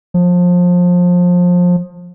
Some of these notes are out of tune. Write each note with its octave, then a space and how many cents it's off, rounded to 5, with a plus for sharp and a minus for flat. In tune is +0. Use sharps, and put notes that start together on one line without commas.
F3 +25